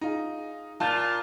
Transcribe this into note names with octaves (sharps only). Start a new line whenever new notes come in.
D#4 F4 G#4
A#2 F4 A5 F6 G6